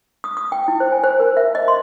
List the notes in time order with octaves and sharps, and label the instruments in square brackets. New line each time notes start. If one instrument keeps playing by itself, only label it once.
[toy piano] D#6
D#6
G5
E4
C5
G#5
C5
A#4
E5
D#5
C6